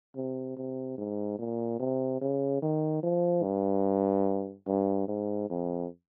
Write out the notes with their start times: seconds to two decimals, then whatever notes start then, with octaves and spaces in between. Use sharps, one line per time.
0.16 C3
0.57 C3
0.98 G#2
1.39 A#2
1.80 C3
2.21 C#3
2.62 D#3
3.03 F3
3.43 G2
4.67 G2
5.08 G#2
5.49 F2